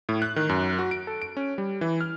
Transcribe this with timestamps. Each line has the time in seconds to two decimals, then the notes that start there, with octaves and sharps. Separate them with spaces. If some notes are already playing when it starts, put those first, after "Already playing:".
0.09 A2
0.22 F#6
0.36 D#3
0.49 F#2
0.79 F#4
0.91 D7
1.07 A4
1.22 D7
1.37 C#4
1.58 G3
1.81 E3
2.01 F6